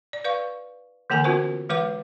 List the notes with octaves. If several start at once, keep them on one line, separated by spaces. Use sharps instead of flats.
D5
B4 D5 F5 C#6
D3 E3 A#3 A4 G#5 A#5
B3 C#4 F4 F#4 A#4 C5
E3 G#3 B4 F#5 D6